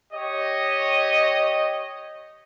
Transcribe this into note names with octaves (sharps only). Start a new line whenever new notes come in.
G4 C#5 D#5